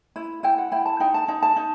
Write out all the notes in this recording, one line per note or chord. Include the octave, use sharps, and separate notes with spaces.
E4
E4 G5
F#5
E4 G5
A5
D#4 G5
A5
D#4 A5
A5
D#4